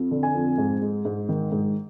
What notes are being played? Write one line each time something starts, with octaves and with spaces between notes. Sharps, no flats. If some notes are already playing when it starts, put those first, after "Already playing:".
Already playing: F2
D3
G#5
F2
G#2
G#3
G#2
D#3
G#2